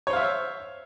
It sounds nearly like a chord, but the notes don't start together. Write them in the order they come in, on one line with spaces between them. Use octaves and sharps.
C#5 C5 F5 E5